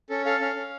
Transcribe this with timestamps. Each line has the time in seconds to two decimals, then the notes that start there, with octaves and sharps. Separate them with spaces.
0.10 C#4 A4
0.25 A4 F5
0.40 C#4 F5
0.56 C#4